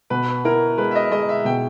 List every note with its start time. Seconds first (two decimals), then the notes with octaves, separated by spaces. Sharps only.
0.10 B2 B4
0.44 E4 A#4
0.78 G#3 B4
0.91 E5
0.95 D#5
1.11 G#3 D#5
1.29 E5
1.45 B2 G5